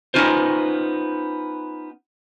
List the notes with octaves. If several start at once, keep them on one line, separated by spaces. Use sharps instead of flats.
B3 C#4 D#4 F4 C5